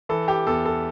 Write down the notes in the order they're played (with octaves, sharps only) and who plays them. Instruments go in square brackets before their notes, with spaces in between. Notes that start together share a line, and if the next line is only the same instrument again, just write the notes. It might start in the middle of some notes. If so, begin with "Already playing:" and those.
[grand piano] E3 A4
G4
E2 A4
A4